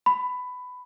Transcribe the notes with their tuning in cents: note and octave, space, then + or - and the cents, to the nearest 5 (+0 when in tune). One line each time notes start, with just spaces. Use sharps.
B5 +15